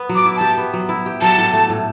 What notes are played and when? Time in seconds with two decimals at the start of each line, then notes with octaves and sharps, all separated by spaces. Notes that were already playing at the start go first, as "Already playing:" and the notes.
Already playing: B3
0.09 F#3
0.15 D6
0.25 E4
0.36 G4 A5
0.58 B3
0.74 F#3
0.89 E4
1.06 G4
1.21 F#3 A5
1.38 A2
1.53 A3
1.70 A2